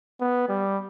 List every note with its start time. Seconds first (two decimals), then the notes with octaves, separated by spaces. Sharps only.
0.21 B3
0.48 G3